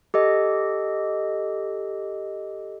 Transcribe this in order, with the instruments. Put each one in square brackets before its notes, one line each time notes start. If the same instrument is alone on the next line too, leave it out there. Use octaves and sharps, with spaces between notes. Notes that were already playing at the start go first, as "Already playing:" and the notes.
[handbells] G4 A4 D#5